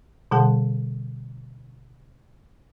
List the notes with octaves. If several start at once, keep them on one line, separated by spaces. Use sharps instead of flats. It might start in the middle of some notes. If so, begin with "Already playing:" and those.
B2 D3 G3 G#4 F#5 A5